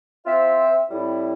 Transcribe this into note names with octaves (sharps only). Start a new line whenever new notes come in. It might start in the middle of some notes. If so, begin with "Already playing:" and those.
C4 F4 C5 E5
A2 G3 C4 E4